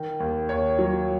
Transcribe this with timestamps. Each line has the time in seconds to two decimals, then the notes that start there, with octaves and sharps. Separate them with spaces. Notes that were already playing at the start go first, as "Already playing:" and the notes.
Already playing: D#3
0.20 D#2
0.49 D#2 C#5
0.79 F#3